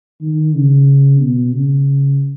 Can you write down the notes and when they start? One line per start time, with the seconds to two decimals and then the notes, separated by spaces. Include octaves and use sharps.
0.21 D#3
0.55 C#3
1.20 B2
1.53 C#3